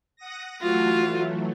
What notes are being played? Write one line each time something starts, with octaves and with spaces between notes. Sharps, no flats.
F#5 D#6 A#6
E3 F#3 A3 F4 F#4